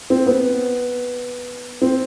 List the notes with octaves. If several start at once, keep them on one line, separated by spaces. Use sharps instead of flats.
C4
B3
C4